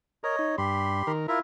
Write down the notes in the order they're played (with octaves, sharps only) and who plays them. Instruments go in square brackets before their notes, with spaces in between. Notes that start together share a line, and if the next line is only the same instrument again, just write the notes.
[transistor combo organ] A#4 [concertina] C#5 D#5
[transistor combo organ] D#4
[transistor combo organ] G2 [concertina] G4 B5 C6
[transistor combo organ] D#3 A#4
[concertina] E4 F4 E5 [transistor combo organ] A#4